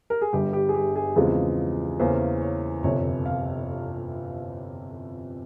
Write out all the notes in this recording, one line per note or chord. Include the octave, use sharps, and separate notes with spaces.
A#4
G#4
G1 G2 G3 G4
G4
G#4
G4
G#4
E2 C#3 F3 G#3 C4 G#4
E2 C#3 E3 A#3 C#4 C5
C#5
G1 F2 C3 C#5
F5